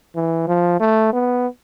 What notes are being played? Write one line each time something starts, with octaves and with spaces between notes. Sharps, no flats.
E3
F3
A3
B3